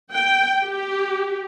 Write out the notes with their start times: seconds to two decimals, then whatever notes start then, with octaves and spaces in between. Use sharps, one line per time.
0.12 G5
0.63 G4